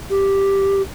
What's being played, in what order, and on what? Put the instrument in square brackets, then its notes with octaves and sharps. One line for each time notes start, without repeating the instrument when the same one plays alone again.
[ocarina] G4